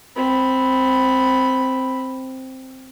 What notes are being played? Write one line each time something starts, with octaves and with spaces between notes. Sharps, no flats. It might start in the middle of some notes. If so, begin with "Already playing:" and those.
C4 B5